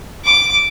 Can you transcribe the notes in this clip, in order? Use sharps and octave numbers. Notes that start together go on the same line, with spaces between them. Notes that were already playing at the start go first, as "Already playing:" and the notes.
D6